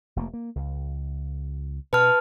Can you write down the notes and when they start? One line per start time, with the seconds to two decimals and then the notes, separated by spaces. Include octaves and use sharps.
0.16 F1 A3 A#3
0.34 A#3
0.56 C#2
1.93 B2 B4 A5 F6